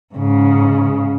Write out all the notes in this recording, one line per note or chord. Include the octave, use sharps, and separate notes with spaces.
G#2 C#3